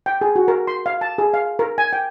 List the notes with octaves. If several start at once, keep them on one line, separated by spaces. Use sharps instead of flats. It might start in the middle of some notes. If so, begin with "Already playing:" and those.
G5
G#4
F#4
A#4
C6
F5
A5
G#4
F5
A#4
G#5
G5